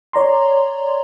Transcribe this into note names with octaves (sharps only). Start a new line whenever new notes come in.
C#5 D5 A#5 C6